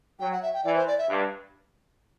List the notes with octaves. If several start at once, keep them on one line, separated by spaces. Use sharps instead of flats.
F#3 G5
F#5
E5
G5
E3 D5
C5
D5
E5
G2